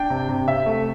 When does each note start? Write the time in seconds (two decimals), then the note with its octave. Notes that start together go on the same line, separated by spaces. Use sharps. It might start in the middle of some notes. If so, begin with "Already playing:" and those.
Already playing: D4 G5
0.10 C3
0.29 C3
0.48 C3 E5
0.66 A3